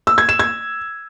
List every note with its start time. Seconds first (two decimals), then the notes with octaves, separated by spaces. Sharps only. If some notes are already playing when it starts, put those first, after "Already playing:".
0.07 E6
0.18 G#6
0.29 E7
0.39 G#6